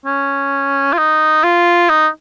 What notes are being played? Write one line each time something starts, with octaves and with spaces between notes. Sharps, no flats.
C#4
F4
D#4
F4
D#4